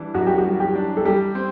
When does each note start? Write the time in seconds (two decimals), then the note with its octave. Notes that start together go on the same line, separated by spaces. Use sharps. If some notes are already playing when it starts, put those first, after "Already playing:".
Already playing: E3 G3 D4
0.14 F#2 F#4
0.27 G4
0.38 F#4
0.45 G3
0.60 G4
0.75 D4
0.97 A4
1.05 G3 G4
1.35 C4